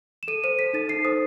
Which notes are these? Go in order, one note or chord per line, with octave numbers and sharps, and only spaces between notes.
E7
A4 D#7
C5 D#7
A4 B6
D#4 A6
A4 C7
C5 D#6